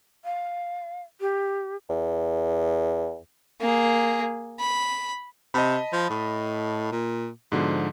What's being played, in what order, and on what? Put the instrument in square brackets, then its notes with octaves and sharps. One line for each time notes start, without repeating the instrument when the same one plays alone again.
[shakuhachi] F5
G4
[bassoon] E2
[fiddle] A#3 G#4
B5
[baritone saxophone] C3 [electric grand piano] D#5 A5 B5
[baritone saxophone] F3
A2
A#2
[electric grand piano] G#2 D3 F3 [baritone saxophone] B2